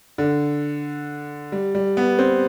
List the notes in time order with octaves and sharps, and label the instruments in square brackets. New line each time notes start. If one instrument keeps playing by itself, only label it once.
[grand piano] D3
G3
G3
B3
C4